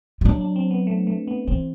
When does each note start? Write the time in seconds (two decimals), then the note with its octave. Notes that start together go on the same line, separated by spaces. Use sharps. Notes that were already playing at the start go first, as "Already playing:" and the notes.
0.21 G3
0.25 F#3 D4
0.41 D4
0.56 C4
0.71 B3
0.87 A3
1.07 A3
1.28 B3
1.48 E3 C4